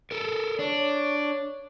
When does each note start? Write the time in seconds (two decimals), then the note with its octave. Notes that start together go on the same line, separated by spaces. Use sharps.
0.11 A4 A#4
0.59 D4 C#5